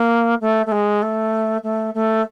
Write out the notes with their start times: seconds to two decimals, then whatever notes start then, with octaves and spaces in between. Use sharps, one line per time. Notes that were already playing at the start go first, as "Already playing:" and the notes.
Already playing: A#3
0.41 A3
0.66 A3
0.72 G#3
1.02 A3
1.63 A3
1.94 A3